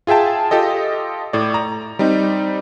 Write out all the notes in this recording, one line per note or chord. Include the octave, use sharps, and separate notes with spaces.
F4 G#4 E5 G5 A5
F4 G4 A4 D#5
A2 D5
A#5
G3 C4 D#4